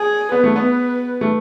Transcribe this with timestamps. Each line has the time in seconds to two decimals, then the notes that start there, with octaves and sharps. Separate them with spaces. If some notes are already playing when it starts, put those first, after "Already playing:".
Already playing: G#4
0.32 B3 B4
0.44 A3
0.56 B3
1.21 A3